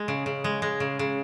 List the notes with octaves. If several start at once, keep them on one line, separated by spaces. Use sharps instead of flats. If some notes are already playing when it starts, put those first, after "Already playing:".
Already playing: G#3
C#3
C#3
G#3
G#3
C#3
C#3